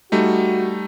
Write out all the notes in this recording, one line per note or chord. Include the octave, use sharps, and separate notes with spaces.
G3 A3 D#4 F#4